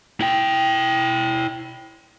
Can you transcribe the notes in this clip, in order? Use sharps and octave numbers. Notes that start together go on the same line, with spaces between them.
E4 G5